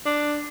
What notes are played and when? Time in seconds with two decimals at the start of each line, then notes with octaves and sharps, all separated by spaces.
0.06 D4